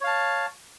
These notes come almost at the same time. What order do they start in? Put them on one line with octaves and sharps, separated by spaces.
C#5 F5 A5